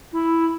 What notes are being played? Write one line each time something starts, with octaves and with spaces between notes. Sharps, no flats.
E4